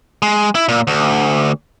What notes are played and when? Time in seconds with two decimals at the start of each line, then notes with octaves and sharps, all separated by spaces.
0.22 G#3
0.55 E4
0.69 A#2
0.87 D2